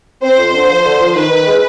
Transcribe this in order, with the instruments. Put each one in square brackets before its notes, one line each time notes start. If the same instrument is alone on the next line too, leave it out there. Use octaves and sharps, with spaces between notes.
[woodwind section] C4 [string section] C5
[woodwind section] F2
D3
F3
D3
F3
[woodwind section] D#3 [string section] B4
[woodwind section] D#3
G#3